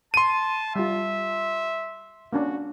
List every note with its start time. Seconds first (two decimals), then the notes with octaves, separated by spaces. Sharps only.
0.14 A5 C6 D#7
0.76 G3 F4 E5
2.33 A#3 C#4 D4 F#4